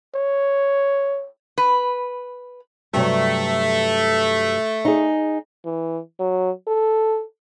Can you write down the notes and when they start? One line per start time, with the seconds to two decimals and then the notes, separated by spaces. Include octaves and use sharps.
0.15 C#5
1.58 B4
2.94 G2 C3 F#3 A3
4.85 D#4 G#4
5.65 E3
6.20 F#3
6.67 A4